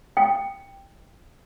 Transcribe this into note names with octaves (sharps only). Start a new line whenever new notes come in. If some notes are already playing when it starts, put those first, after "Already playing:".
G5